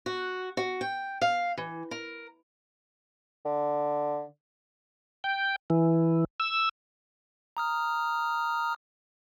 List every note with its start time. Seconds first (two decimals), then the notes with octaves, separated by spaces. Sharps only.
0.06 F#4
0.57 F#4
0.81 G5
1.22 F5
1.58 E3
1.91 A#4
3.45 D3
5.24 G5
5.70 E3
6.40 E6
7.57 A#5 D#6 F6